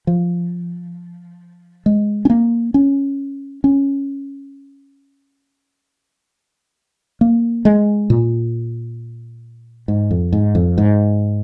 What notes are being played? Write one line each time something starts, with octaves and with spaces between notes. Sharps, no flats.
F3
G#3
C#4
A#3
C#4
C#4
A#3
G#3
A#2
G#2
F2
G#2
F2
G#2